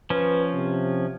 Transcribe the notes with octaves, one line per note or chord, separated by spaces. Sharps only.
F3 C#4 B4
C3